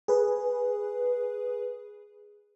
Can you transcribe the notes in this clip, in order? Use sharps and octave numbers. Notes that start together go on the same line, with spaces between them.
G#4 B4